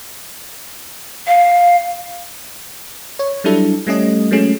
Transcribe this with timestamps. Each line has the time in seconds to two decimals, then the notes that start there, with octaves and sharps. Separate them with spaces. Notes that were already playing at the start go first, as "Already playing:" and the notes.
1.27 F5
3.19 C#5
3.44 F#3 G3 D4 E4 A4
3.87 G3 A3 C#4 D#5
4.31 F#3 G#3 A3 C#4